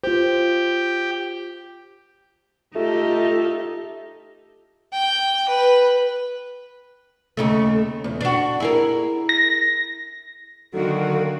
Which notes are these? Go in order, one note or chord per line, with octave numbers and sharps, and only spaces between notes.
F4 G4 C5
A3 D#4 F4 G4 A4 E5
G5
B4
D#2 C#3 A3
E2
D4 F#4
E4 G#4 A#4
A#6
D3 D#3 F#3 A#3 F#4 A4